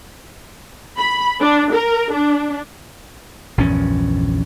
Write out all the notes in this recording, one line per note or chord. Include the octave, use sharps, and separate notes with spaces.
B5
D4
A#4
D4
A#1 E2 G2 C#4